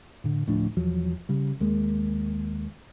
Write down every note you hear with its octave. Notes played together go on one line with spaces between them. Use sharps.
A2 D3
D1 A2 F3 D4
E1 E2 F3 F#3
C#3 G3
D#2 G#3 A#3